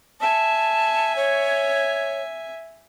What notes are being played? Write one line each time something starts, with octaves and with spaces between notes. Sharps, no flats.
E5 G#5 A5
C#5